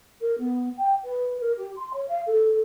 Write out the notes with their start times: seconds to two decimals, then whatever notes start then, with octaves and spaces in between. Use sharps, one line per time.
0.21 A#4
0.38 B3
0.77 G5
1.04 B4
1.41 A#4
1.57 G4
1.76 C6
1.93 C#5
2.09 F5
2.26 A4